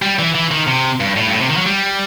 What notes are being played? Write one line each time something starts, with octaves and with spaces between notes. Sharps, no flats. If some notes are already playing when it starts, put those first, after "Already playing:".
G3
E3
E3
D#3
C3
G2
A2
G2
A2
C3
D#3
F#3
G3